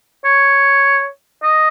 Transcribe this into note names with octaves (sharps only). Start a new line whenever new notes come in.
C#5
D#5